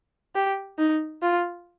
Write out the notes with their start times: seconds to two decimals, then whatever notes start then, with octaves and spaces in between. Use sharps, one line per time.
0.35 G4
0.79 D#4
1.22 F4